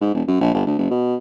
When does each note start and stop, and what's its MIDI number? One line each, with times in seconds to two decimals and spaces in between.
0.01 0.12 44
0.14 0.23 28
0.28 0.37 42
0.41 0.53 34
0.54 0.63 31
0.67 0.78 38
0.79 0.90 30
0.91 1.17 47